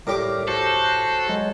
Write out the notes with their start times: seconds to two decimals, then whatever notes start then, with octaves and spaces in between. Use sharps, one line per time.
0.07 A2 G3 G4 A#4 D6
0.48 F#4 A4 C5
1.29 F#3 G#3